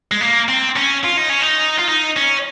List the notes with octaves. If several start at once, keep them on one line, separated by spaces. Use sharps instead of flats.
G#3
A#3
C4
C#4
F4
D#4
C#4
D#4
F4
D#4
C#4